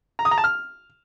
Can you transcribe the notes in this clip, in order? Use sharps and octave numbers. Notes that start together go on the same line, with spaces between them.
A#5
D#6
A#5
A5
F6